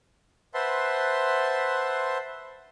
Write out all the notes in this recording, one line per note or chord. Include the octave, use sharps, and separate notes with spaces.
B4 C5 E5 F#5 A5 C6